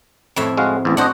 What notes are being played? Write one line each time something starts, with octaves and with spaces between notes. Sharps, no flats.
F2 A2 E5
G#3 F#4 F5
A1 E2
D4 F#4 C5 D#5 F#5